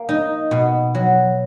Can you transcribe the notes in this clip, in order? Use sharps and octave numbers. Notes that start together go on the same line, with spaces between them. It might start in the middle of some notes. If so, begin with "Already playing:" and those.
Already playing: A#3
D#4
B2
F#3